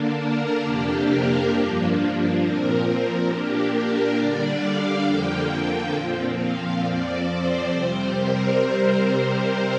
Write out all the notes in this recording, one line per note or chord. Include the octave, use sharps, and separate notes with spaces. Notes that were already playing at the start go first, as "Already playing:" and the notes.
Already playing: D3 A#3 D4
A#4
F2 C3 A#3 D4 G4
A#4
G2 F3 A#3 D4
A#2 F3 C4 A#4
A#2 A#3 D4 G4
A#4
D3 G3 D4 D5
F5
F2 D3 F3 A#3 G5
A#2 F3 C4
F5
F2 F3 C4 D5
C5
C3 G3 C4 C5
A#4